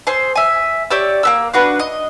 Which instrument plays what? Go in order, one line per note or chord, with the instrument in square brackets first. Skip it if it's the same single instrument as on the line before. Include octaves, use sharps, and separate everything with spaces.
[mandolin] G#4 C5 C6 E6
E5 G#5
G4 C#5 D5 E6
A#3 B3 E6
D4 F#4 B4
D#5